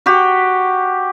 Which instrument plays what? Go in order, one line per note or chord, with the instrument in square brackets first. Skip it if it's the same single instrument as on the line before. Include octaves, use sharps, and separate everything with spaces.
[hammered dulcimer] F#4 G4